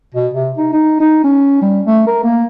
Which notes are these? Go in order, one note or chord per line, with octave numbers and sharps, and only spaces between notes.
B2
C3
D#4
D#4
D#4
C#4
G3
A3
A#4
A#3